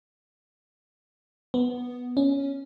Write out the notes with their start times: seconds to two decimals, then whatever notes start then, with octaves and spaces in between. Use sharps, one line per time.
1.54 B3
2.17 C#4